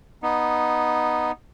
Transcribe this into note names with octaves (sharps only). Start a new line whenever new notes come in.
B3 D#4